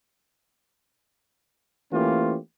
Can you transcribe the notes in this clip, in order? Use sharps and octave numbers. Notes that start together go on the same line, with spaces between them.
E3 A3 A#3 C#4 F4 G4